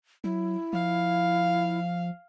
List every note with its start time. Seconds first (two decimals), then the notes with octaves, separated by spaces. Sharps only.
0.24 F#3 E4
0.73 F3 F5